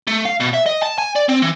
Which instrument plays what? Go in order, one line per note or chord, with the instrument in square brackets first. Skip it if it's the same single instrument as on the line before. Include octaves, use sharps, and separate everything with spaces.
[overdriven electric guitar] A3
F5
B2
E5
D#5
A5
G#5
D5
C4
E3